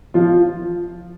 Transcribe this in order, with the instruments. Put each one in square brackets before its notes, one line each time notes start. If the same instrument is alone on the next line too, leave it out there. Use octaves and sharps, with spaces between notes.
[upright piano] F3 F4